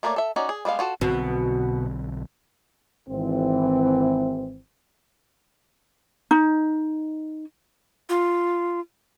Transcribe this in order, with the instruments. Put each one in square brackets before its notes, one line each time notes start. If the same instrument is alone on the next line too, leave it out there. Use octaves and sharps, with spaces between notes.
[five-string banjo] A3 A#3 A#4 C#5 D5
A4 E5
C#4 D#4 F#4 D5
G#4
G3 G#3 B3 F5
F4 F#4 A4
[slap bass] B1 D3 C4 [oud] B2
[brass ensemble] G#1 E3 C4
[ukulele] D#4
[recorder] F4